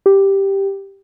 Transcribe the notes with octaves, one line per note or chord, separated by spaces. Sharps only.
G4